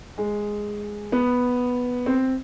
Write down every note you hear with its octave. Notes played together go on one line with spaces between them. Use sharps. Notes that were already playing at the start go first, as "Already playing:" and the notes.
G#3
B3
C4